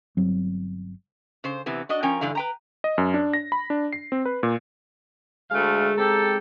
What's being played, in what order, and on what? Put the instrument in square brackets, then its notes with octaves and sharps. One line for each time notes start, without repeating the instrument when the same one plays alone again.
[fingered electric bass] G1 F#3 C4
[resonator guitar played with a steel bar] C#3 C5
C3 E3 B3
D4 F#4 D#5
F3 C#4 A#4 G5 G#5
G2 D3 E3 F5
B4 G5 A#5
[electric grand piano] D#5
F#2
D4
A#6
B5
D4
C7
C4
B4
A#2
[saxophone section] D2 A3 F5 [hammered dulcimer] G#3
[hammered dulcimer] C4 D#4 [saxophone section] G4 A4